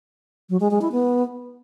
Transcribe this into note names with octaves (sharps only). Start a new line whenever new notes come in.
F#3
G#3
G#3
E4
B3